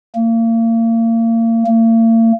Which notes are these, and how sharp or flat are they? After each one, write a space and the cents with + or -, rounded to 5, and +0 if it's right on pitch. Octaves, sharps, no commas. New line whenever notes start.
A#3 -35
A#3 -45